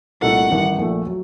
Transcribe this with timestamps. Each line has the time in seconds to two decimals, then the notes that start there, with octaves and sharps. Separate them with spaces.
0.22 C2 A#2 A3 D#4 A4 F#5
0.50 A1 G2 D#3
0.78 A#1 A#2 A3
1.07 F#3